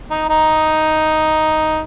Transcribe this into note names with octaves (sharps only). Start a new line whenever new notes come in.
D#4
D#4